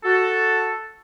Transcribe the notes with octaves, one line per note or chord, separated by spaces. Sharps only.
F#4 A4